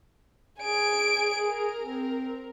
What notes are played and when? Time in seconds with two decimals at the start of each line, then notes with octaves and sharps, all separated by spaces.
0.60 G#4 G#5 D7
1.45 A#4
1.83 C4